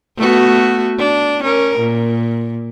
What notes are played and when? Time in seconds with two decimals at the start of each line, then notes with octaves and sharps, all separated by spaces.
0.18 A3 B3 F#4
0.99 D4
1.43 C#4 A#4
1.79 A#2